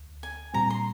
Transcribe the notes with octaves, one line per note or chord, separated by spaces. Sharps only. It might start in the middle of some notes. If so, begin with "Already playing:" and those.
Already playing: D2
G#5
A#2 G3 C4 A#5
C6